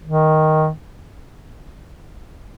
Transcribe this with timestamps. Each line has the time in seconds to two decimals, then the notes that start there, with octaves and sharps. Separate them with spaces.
0.05 D#3